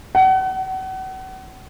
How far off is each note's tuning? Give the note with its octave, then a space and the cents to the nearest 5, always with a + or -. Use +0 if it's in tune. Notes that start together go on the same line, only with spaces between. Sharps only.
F#5 +35